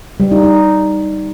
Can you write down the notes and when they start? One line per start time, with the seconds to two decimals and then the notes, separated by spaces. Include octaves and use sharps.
0.20 G3
0.32 D#4
0.43 D#4